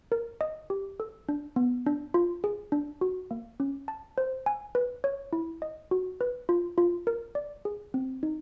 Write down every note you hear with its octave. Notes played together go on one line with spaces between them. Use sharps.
A#4
D#5
G4
A4
D4
B3
D4
F4
G#4
D4
F#4
A#3
C#4
A5
C5
G#5
B4
C#5
E4
D#5
F#4
B4
F4
F4
A#4
D5
G#4
C4
D#4